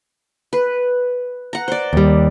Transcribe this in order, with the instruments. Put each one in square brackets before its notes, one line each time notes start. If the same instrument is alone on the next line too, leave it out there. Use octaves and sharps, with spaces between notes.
[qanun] B4
F#5 A#5
C5 D5
[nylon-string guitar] D#2 G3